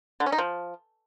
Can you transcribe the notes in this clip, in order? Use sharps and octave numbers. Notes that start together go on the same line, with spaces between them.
D3
C#4
D#4
F3